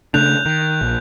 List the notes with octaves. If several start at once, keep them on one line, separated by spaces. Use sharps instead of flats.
C#3 A3 D4 F#6 G6 F7
D#3 G6
A#1